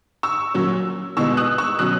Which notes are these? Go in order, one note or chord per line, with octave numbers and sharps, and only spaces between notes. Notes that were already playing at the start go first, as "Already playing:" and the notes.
C#6 E6
A#2 F#3 C#4
E2 B2 G#3 C#6 E6
D#6 F#6
C#6 E6
B2 F#3 C#4 D#6 F#6